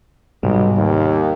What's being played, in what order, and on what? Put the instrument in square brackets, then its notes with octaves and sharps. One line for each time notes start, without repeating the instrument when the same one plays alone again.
[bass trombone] B1 [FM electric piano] G#2 C3 G3
[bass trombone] D#2